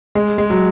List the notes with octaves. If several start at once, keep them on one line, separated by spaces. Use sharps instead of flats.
G#3
G#3
F#3